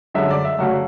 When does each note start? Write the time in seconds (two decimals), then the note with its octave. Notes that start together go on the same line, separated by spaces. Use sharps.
0.14 F#2 D3 G#3 E5
0.30 D5
0.45 E5
0.59 F#2 C#3 F#3 A3 F#5